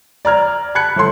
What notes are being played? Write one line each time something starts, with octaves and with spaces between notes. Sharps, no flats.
D5 A#5 F6 G#6
A5 B5 F#6 G#6 C#7
G1 A4 C6